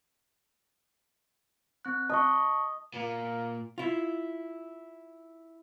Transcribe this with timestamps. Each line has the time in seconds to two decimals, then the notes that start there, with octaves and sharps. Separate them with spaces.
1.85 C4 F#6
2.10 D#5 A5 C#6
2.94 A#2 A#3
3.78 E4 F4